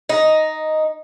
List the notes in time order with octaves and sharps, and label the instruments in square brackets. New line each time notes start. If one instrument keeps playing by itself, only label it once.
[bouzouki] D#4